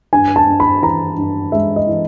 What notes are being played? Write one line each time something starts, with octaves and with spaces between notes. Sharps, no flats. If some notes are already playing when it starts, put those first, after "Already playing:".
G2 G#5
A5
G2
B5
E3 A#5
G2
G#3 E5
D#5
E3